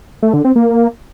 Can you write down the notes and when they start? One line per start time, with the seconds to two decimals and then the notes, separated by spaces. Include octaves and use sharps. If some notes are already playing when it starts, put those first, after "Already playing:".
0.22 A3
0.33 D3
0.45 C4
0.56 A#3